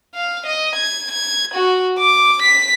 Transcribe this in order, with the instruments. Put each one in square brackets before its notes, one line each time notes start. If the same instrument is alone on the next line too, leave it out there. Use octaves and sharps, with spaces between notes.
[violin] F5
D#5
G#6
G#6
F#4
D6
B6